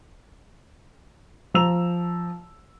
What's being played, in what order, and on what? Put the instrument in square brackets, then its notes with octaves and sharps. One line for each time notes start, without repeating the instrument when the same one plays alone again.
[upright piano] F3 A#5 E6 F7